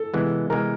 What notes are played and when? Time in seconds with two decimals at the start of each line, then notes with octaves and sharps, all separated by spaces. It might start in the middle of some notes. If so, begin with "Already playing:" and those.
Already playing: A4
0.14 C3 E3 G#3 B3
0.50 C3 E3 G#3 B3 A#4